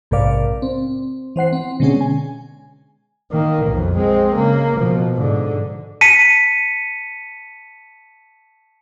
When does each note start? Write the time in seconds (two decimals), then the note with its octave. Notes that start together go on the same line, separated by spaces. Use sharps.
0.11 A#1 G#2 C3 A#4 D5 F5
0.62 C4
1.36 E3 C5 F#5 C7
1.53 C4
1.80 B2 D3 G#3 C#4 G#4
2.01 G#5
3.32 D#3 A#3
3.67 B1 F2
3.98 G#3 C4
4.35 C#3 A#3
4.79 B2 F3
5.14 G#2 D3
6.01 A5 B6 C#7 D#7